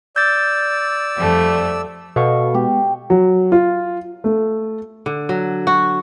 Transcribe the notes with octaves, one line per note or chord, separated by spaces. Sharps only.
D5 E6 G6 A6
F2 G3 A3
B2 A4 F5 C#6
G#3 B3 G4
F#3
F4
A3
D3
F#3
F#4